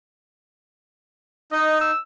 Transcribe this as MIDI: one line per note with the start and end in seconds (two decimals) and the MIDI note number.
1.52 1.91 63
1.52 1.80 75
1.81 1.98 88